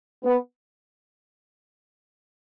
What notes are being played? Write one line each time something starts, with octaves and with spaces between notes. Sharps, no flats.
B3